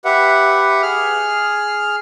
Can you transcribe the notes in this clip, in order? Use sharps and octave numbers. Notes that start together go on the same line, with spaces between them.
G4 B4 E5 F#5
G#4 F6